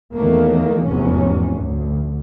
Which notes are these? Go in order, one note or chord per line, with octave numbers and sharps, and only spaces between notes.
E2 D#3 F#3 A3 A#3
F1 E2 G#2 C3 F#3 C#4
D2